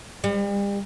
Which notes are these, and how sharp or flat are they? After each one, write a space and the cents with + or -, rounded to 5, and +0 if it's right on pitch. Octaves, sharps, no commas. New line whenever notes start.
G3 +40